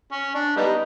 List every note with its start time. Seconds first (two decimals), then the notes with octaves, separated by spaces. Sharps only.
0.12 C#4
0.35 D4
0.57 G3 B3 D#4